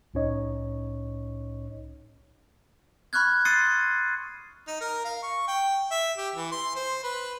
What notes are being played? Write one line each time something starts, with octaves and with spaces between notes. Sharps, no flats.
C2 A2 C#4 D#4 C#5 D#5
B5 C#6 F6 F#6 G#6
C6 D#6 A6 C7 C#7 D#7
D#4
A#4
F5
C#6
G5
E5
G4
E3
C6
C5
B4